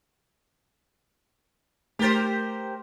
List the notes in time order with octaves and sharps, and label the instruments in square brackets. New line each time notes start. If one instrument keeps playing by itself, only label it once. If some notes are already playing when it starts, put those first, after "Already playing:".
[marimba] A3 A6 [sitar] G4 A#4 C5